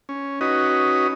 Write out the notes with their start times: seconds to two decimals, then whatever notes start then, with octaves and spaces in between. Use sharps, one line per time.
0.09 C#4
0.41 C#4 D#4 F#4 B4 D#5